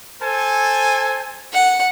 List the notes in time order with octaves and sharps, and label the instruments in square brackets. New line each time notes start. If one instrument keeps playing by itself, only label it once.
[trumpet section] A4 C5 G#5
[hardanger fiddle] F#5